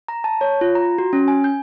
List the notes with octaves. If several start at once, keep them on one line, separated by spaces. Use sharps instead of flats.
A#5
A5
C#5
F4
A#5
F#4
C#4
G#5
G6